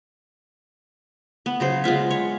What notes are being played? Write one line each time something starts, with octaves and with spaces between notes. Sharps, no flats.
B3
C#3 F#3 C5
G#3 B3 F4 E5
C#5